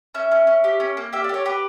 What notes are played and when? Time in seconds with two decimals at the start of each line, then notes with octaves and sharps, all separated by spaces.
0.15 C#4 E5
0.32 C#4
0.47 C#4
0.64 G4
0.80 C#4
0.97 A#3
1.13 G4 E5
1.24 D5
1.29 G4 C#5
1.46 G4 B4